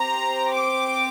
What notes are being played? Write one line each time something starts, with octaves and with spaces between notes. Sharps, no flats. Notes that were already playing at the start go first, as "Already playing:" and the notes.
Already playing: C4 G4 A#5
D6